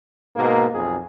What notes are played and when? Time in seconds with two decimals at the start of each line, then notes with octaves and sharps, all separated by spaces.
0.36 G#2 B2 A#3
0.74 B1 F2 G#4